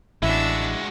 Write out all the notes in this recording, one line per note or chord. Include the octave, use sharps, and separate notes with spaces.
A1 G#3 D4 E4 F#4 E5